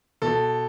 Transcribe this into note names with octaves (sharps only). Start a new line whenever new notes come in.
B2 A4